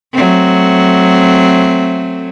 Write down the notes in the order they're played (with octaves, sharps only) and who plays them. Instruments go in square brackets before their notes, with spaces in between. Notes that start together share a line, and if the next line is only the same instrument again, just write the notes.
[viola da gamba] F#3 A3 C4